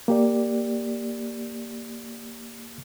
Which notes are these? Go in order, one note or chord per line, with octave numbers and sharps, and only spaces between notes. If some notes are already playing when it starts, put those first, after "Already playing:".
A#3 G4 D5